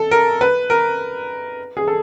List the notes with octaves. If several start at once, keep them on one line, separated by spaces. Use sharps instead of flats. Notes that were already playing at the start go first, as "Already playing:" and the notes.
Already playing: A4
A#4
B4
A#4
G#4
A4